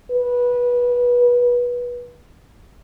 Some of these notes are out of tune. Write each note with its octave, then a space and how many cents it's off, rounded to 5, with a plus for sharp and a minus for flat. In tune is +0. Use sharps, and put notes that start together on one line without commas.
B4 -20